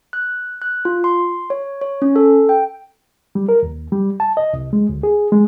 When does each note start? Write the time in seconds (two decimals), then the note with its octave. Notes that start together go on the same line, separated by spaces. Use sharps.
0.13 F#6
0.62 F#6
0.85 F4
1.04 C6
1.50 C#5
1.81 C#5
2.02 C#4
2.16 A4
2.49 G5
3.35 G3
3.49 A#4
3.63 D#2
3.92 G3
4.20 A5
4.37 D#5
4.53 C2
4.73 G#3
4.89 D2
5.03 G#4
5.32 G#3